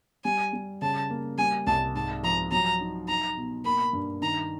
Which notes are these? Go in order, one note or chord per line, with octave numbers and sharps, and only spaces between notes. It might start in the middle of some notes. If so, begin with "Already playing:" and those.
G3 G#5
G3
C#3 A5
A#3
G3 G#5
C2 A5
G#2 A5
F3 A#5
F#3 A#5
D#4
D#4 A#5
B2
A#3 B5
G2
D#3 A#5